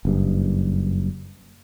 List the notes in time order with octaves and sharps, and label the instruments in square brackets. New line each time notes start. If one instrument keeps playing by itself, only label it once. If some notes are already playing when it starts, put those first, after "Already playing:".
[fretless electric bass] F#1 G2